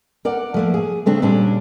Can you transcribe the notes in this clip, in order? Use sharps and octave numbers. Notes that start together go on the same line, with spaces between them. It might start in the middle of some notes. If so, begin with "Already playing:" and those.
A#4 D5 F#5
F3 A3 A#3
G#4
C#3 A3 C4 D4
A#2 G3 C#4 D4